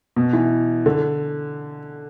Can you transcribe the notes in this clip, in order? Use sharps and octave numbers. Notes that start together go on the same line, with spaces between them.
B2
E3
D3